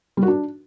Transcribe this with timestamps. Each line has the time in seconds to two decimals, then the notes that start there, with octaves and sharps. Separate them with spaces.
0.17 G3
0.23 F#4
0.28 D4